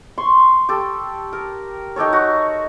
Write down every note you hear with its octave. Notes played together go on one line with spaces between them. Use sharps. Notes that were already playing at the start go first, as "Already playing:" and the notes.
C6 C#6
G4 A4
A#4
D#4 G4 A4 C#5
F#4